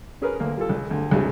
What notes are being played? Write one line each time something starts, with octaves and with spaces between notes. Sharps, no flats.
C#4 G#4 A#4 B4
D2 A#3
G3 F4 A4
C#2
D2 G2
C#2 G2 C3